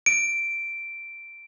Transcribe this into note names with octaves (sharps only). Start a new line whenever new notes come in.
D7